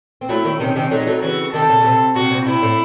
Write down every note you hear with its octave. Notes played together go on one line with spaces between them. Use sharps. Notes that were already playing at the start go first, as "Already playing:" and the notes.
C4
F#3 A3 E4
D#3 F#3
C3 D#3 C#4
C3 D#3
F#3 A3 D#4
G#3
F#3 A3
C#3 E3 F#4
C3 D#3 A4
C#3
C#3
C3
C3 F#4
C3
C3 E4
A2